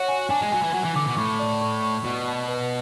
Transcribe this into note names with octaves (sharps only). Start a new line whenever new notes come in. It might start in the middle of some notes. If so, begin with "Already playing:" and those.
Already playing: F#4 C#5
G#5
D4 G#5
G#3
F#3 G#5
E3
F#3 G#5
E3
D3 D6
B2
A2 C#6
D5
C#6
C#6
B2 D5
A5
B4